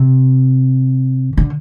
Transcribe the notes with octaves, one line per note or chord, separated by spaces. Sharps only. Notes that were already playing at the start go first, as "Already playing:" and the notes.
Already playing: C3
D3